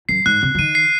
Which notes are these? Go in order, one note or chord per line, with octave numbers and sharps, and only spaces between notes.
F#2 C7
G#2 F#6
C3 F#6
F3
D#3 D#7
C7